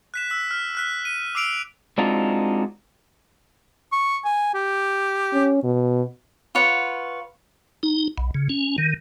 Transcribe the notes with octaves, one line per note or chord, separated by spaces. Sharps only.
F#6 B6 E7
E6 B6
F6
F6 F#6 B6
D#7
D6 E6 C7 D7 F7
G#3 C4 D4 D#4 F4 F#4
C#6
G#5
G4
C#4
B2
F4 B4 C#5 F#5
D#4
B1
C#3
C#4
D#3